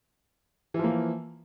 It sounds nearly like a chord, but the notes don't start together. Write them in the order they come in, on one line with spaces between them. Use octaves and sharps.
E3 F3 A#3